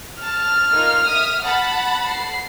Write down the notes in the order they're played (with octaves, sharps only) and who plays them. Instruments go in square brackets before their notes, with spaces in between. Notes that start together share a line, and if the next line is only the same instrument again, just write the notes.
[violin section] A5 [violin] F6
[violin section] A#3 D#4 F4
E5 D#6
F#5 A5 B5
[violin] C7